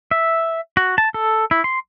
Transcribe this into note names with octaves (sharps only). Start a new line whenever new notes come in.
E5
F#4
A5
A4
E4
C6